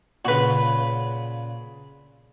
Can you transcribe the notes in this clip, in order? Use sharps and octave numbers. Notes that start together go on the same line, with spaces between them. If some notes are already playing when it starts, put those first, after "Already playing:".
A#2 C#3 F#4 B4